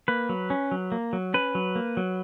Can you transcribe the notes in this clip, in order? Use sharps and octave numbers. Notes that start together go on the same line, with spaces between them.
A#3 B4
F#3
C#4
F#3
A#3
F#3
C#4 B4
F#3
A#3
F#3